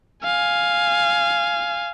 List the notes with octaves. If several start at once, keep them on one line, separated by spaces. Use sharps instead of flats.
F5 G#5